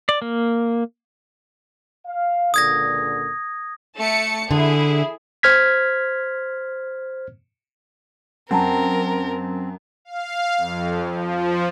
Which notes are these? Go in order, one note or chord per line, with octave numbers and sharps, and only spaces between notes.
D5
A#3
F5
C#2 A#2 D3 D#6 G#6 A#6
A3 A5 C#7
D3 E4 G#4
C5 F6 G#6 B6
F#2 C4 A#4 F#5 A5 A#5
F5
F2
F3